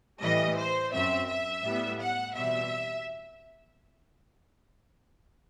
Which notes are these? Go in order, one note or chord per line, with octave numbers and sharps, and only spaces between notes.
A2 E3 G3 D#5
C5
F#2 F#3 C4 E5
E5
A2 G3 B3
F#5
E2 B2 G3 C4 E5